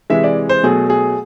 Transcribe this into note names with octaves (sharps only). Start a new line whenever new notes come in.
C3 E3 G#3 E5
D5
C5
B2 F#3 A3 G#4
G#4